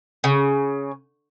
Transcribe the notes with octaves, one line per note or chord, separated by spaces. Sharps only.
C#3